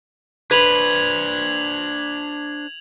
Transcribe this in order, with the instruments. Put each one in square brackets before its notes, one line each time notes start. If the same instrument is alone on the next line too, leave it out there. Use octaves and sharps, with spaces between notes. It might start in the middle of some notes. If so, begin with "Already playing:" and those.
[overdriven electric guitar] D4 C5 [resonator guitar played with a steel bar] B4 [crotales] G#6 F7 F#7